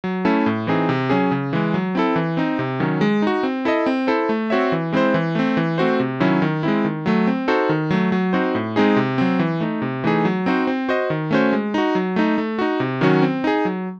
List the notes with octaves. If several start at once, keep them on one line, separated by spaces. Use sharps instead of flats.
F#3
A3 C#4 E4 A4
A2
E3 C4 D#4 G#4
C3
F#3 C#4 G#4
C#3
E3 G#3
F#3
C4 E4 A4
E3
C4 D#4
C3
D#3 F#3 C#4
G#3
D#4 F#4
C4
E4 A4 D#5
C4
E4 A4 C5
A3
C4 F#4 C#5 E5
E3
G#3 C4 E4 C5
E3
A3 C4
E3
A3 C4 F#4 C5
C3
D#3 F#3 C#4 E4
D#3
G#3 C4 E4
D#3
F#3 A3
C4
D#4 F#4 A4 C5
D#3
F#3 A3
F#3
C4 D#4 F#4 C5
A2
G#3 C4 D#4 G#4
C3
F#3 C4
E3
A3 D#4
C3
E3 A3 D#4 G#4
F#3
C4 D#4 F#4 C5
C4
F#4 C5 D#5
D#3
A3 C#4 F#4 C5
G#3
D#4 F#4
F#3
A3 D#4
A3
D#4 F#4
C3
D#3 F#3 C#4 F#4
C4
D#4 G#4
F#3